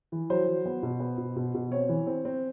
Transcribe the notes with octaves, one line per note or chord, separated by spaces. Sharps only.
E3
F#3 C5
F#3
B3
B2
B3
B2
B2
B2
C4 C#5
E3
C4
C4